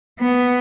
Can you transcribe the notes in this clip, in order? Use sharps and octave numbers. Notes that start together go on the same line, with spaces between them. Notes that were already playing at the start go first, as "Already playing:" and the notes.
B3